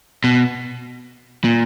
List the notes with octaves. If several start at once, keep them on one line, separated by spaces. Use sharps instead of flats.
B2
A#2